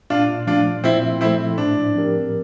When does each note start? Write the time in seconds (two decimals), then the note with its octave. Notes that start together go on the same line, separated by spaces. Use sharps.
0.10 A#2 D4 F4
0.47 F3 A3 D4 F4
0.84 A#2 C4 E4
1.21 F3 A3 C4 E4
1.58 A2 D4
1.95 F3 C4 G4 A#4